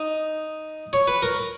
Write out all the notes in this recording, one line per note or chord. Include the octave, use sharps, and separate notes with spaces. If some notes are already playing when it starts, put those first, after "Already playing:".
Already playing: D#4
C#5
B4
A#4